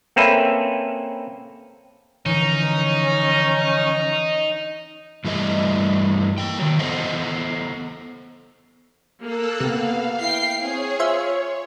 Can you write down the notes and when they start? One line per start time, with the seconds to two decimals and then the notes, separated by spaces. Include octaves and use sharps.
0.16 A#3 C4 C#4 A4 B4 E5
2.26 D3 E3 F3 C#4 D#4
5.24 G2 E3 G3 A3 D#5
6.38 A#3 G5
6.59 D#3 F#3
6.79 B3 A4 C5 D#5 F#5
9.22 A#3 A4 E6 F#6
9.60 C3 B3 F5
10.21 E4 G5 C7
10.61 C4 G#4 C#5
11.00 F4 C5 E5 F5